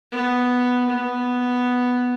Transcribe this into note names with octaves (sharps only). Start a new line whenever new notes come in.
B3
B3